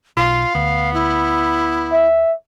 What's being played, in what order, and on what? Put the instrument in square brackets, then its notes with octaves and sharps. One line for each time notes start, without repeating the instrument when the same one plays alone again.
[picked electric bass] B1 [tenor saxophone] F4 [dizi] F5
[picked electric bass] D2 [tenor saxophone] B3
[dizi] E4
[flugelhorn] E5